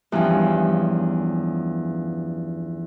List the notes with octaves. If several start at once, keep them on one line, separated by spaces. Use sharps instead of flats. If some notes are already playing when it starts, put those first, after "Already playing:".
E2 G2 F3 C#4